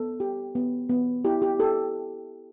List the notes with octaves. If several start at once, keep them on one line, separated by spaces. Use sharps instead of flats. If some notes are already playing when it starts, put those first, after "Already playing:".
Already playing: B3 A4
G4
B3
B3
E4 G4
G4
G4 A4